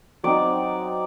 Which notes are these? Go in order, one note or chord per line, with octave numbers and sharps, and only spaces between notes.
F#3 C4 D#4 D5